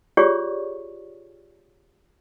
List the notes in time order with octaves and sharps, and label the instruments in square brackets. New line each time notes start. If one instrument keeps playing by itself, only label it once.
[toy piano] F4 G4 G#4 C#5 D5 C#6